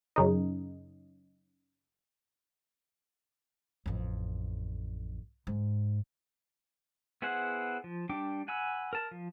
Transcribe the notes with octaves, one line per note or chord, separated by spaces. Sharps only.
F#2 C#3 D#4
A1 F2
G#2
B3 E4 G#4 C5 F#5
F3
G3 D4 G5 D6
F#5 G#5 B5 E6
A#4 A5
F3